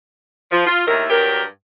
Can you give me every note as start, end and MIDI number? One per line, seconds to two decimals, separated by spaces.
0.52 0.64 53
0.66 0.81 65
0.87 1.04 39
0.87 1.04 45
0.87 1.04 51
0.87 1.04 70
0.87 1.04 76
1.10 1.43 43
1.10 1.43 54
1.10 1.43 67
1.10 1.43 70